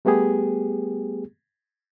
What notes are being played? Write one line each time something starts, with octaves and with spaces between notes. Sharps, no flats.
G3 A3 B3 G4 G#4